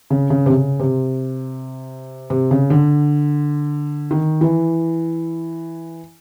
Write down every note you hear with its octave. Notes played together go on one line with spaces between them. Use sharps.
C#3
C#3
C3
C#3
C3
C3
C#3
D3
D#3
E3